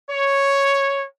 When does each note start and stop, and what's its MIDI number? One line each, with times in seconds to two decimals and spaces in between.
0.10 1.05 73